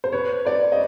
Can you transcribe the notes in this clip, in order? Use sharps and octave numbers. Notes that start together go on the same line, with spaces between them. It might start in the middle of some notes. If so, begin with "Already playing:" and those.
C5
B4 C#5
C5 D5
D#5